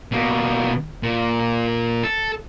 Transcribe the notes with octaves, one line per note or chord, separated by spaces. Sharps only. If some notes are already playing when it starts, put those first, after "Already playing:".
B2 A#3
A#2
A4